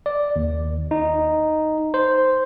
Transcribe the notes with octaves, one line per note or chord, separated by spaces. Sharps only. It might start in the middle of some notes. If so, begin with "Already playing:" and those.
D5
D#2
D#4
C5